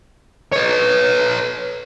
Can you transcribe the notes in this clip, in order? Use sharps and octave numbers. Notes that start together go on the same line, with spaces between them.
B4 C#5